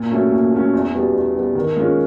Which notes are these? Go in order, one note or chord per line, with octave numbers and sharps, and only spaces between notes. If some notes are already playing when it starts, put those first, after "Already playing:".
Already playing: A#2
F#3 A3 C#4
A#2
F#3 A3 C#4
E2
B2 G3 B3
E2
B2 G3 B3
D#3
G#3 C#4 F4